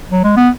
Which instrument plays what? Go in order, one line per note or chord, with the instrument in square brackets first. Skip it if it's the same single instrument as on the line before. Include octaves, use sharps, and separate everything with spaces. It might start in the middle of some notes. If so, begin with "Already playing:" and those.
[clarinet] F#3
G#3
B3